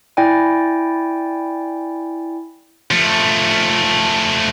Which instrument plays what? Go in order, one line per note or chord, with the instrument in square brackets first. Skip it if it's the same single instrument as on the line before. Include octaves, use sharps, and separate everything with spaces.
[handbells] E4 D5 G5 G#5
[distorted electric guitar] F3 A3